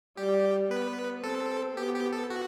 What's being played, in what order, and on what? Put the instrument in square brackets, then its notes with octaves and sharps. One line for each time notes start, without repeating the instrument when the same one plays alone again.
[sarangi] G3 [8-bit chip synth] G4
[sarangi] B3 [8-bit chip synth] B4
[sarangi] C4 [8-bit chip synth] A4
[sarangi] B3 [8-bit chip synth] G4
[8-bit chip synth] G4
A4
F#4